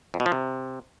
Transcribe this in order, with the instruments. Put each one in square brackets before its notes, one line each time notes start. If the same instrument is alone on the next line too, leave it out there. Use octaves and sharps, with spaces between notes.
[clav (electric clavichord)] F2
B2
F3
C3